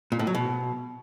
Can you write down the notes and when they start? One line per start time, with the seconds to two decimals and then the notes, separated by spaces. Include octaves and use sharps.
0.12 A#2
0.19 A2
0.27 F#3
0.35 B2